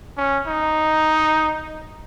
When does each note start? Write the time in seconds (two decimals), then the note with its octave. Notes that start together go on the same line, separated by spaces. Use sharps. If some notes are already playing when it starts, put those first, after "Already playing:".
0.18 C#4
0.47 D#4